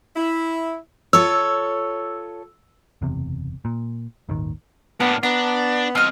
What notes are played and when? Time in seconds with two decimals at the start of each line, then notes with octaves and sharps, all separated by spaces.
0.16 E4
1.13 F4 A4 C#5 E6
3.02 F#1 E2 C3
3.65 A#2
4.29 D#1 G#1 D#2 D#3
5.00 A2 A#3 B3 D4
5.23 B3 D4 A#5
5.95 C4 F4 D#5 F6